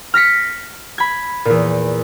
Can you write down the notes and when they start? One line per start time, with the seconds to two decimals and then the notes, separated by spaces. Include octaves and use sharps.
0.14 F6 A#6 B6 C#7
0.98 B5 G#6
1.45 E2 A#2